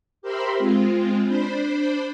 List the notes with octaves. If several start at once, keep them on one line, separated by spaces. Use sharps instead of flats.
G4 A#4 C5 E5 B5 C6
G#3 C4 F4
D4 C5 B5